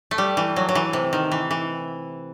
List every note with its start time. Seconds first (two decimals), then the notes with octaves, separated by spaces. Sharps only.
0.11 A3
0.18 G3
0.37 E3
0.56 F#3
0.69 F#3
0.75 E3
0.93 C3
1.13 D#3
1.32 E3
1.51 E3